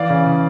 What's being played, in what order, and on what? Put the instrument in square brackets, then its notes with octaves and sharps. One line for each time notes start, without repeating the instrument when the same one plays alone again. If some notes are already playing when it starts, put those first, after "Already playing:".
Already playing: [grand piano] E3 D5 F5
C#3
C#3